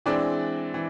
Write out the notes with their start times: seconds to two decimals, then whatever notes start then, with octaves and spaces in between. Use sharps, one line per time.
0.06 E3 G#3 C4 D4 D5
0.74 E3